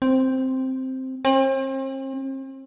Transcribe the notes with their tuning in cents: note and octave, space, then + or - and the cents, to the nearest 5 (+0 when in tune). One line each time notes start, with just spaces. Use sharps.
C4 +0
C4 +40